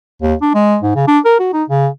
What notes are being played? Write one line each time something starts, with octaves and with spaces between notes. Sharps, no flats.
D#2
D4
G#3
G#2
C#3
D4
A#4
F#4
D#4
C#3